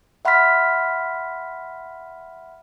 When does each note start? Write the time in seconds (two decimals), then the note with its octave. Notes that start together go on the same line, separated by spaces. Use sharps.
0.25 E5 F#5 B5 C6 F6 B6